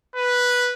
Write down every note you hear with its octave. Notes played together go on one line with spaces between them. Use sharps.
B4